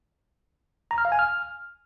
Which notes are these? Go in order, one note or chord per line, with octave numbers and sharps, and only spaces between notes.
A#5
F6
F5
G#5
F6